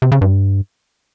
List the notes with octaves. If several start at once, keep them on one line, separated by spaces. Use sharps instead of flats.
C3
C#3
G2